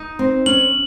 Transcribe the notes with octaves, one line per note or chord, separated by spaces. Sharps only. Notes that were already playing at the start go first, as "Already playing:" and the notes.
Already playing: D#4
C4
C#4 F#7